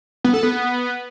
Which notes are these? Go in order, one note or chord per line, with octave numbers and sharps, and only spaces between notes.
B3
A4
B3